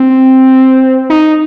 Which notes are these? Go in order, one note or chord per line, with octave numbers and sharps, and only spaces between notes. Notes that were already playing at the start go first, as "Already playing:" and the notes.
Already playing: C4
D#4